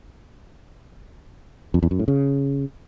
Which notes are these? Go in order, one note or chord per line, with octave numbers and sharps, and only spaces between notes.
F2
E2
F#2
A2
C#3